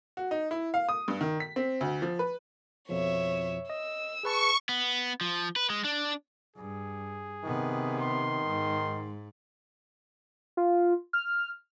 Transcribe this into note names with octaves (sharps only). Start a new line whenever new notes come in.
F#4
D#4
E4
F5
D#6
G2
D#3
B6
C4
D2
F3
B4
F2 B2 F3 C#5 E5
D#5 E6
G#4 B4 A5 C#6
B3
F3
B4
G#3
D4
G2 G#4
C3 D#3 B3
C6
G#2
F4
F6